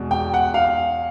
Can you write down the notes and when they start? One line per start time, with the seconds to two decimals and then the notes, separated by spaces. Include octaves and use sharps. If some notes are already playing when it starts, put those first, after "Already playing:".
Already playing: E2 B2 G#3
0.11 G5
0.34 F#5
0.54 F5